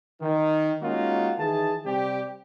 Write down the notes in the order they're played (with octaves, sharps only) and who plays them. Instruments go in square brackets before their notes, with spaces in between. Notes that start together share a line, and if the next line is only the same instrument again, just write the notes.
[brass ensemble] D#3
G#3 A#3 C#4 D#4 F4 F#4
D#3 E3 G#4 A5
C3 G3 C4 G4